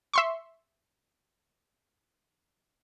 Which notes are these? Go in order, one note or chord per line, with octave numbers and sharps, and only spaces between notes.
E5 C6 C#6